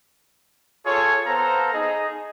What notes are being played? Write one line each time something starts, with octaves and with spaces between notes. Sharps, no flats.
F4 G#4 A4 C#5
B3 A4 C5 F5 A#5
D#4 G#4 D#5